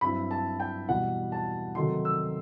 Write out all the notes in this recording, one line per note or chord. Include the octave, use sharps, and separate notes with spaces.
G2 F#3 C4 E4 B5
A5
G5
E2 B2 G3 F#5
A5
C3 D#3 F#3 A3 D#4 C6
E6